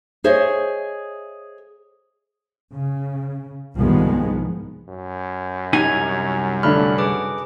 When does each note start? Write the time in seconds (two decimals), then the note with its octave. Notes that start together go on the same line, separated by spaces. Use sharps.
0.24 G#4 C5 C#5 D#5 E5
2.73 C#3
3.77 C2 G#2 D#3 F3 G#3 B3
4.89 F#2
5.73 C2 D#4 G#5 A#5 G#6
6.63 D3 A3 D5 B5 F6 F#6
6.98 G#4 B4 D6